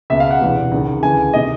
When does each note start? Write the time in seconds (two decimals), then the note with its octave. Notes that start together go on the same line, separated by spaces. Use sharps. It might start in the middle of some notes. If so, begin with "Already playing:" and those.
0.10 C#2 B2 E5
0.20 F5
0.31 F#5
0.41 E1 E2 C3
0.72 C#2 C3 D#3
1.02 D2 C#3 E3 G#5
1.33 C3 D#3 D#5